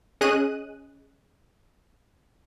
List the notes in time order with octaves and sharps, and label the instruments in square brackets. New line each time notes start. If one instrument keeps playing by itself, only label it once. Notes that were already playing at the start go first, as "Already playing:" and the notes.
[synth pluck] C#4 G#4 D#5 F#6 D#7